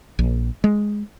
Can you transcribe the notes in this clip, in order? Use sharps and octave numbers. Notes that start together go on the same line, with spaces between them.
A#1
G#3